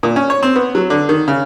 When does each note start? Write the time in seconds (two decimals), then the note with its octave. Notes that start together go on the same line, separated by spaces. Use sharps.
0.03 A#2
0.16 C#4
0.30 C#5
0.43 C4
0.56 B3
0.75 F#3
0.90 D3
1.09 D#3
1.28 C#3